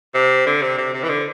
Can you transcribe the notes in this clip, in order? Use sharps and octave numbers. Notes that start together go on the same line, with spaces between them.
C3
D3
C3
C3
C3
E3
D3